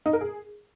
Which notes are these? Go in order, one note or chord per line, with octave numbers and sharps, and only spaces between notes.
D#4
A#4
G#4